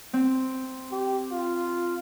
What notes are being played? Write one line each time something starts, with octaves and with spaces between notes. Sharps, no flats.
C4
G4
F4